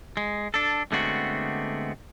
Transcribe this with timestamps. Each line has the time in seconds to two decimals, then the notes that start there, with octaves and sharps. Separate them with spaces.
0.17 G#3
0.54 D4 A4
0.92 D3 G#3 A3 B3 C4 F#4